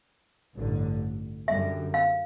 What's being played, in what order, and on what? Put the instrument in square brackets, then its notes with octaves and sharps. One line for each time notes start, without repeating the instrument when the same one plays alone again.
[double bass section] A1 G2 D3
[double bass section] F#2 D3 G3 [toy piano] E5
[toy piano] F5